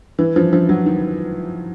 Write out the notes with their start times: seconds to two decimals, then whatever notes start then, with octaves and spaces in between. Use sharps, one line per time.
0.19 E3
0.36 F3
0.53 F3
0.69 F#3
0.86 D#3